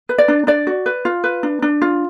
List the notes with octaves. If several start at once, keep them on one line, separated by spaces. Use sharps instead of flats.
B4
D5
D4
D4 D5
F#4
B4
F4
B4
D4
D4
F4